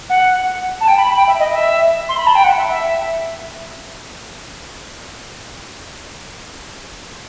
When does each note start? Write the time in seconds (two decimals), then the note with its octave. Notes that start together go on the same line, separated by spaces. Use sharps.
0.09 F#5
0.80 A5
0.88 G5
0.97 B5
1.07 B5
1.17 G5
1.27 E5
1.39 D#5
1.52 E5
2.09 C6
2.17 B5
2.27 A5
2.35 G5
2.44 F#5
2.57 E5
2.70 E5